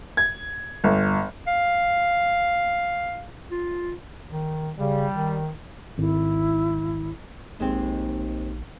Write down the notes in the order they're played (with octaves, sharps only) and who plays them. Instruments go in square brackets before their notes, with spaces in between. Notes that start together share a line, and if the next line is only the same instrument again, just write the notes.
[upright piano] G#6
G1
[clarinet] F5
F4
[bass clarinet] D#3
[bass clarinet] C#3 [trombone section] G3
[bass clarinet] D#3
[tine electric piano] G#1 [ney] E4
[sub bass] A#1 [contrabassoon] D#2 [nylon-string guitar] G#3 C4